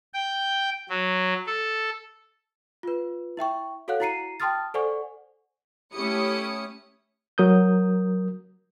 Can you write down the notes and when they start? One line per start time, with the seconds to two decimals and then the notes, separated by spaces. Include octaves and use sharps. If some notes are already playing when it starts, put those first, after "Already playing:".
0.14 G5
0.89 F#3
1.47 A4
2.83 F4 B4
3.37 E4 E5 G5 C#6
3.88 F#4 A4 C#5 F5 F#5 F#6
4.00 E4 F#4 A#5 C7 C#7 D#7
4.40 G5 A5 C6 D#6 F6 A6
4.74 A4 C5 D5 F#5 G#5 C#6
5.93 A3 C#4 E4 G4 D#6 C#7
7.38 F#3 A#4 D#6 G6